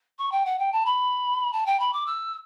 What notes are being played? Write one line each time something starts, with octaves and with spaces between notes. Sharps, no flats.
C#6
G5
F#5
G5
A5
B5
A5
G5
B5
D6
E6